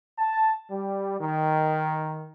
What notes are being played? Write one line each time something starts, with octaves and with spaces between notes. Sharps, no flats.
A5
G3
D#3